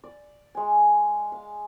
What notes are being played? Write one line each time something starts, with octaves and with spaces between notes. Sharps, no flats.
D5
G#3 G#5
F5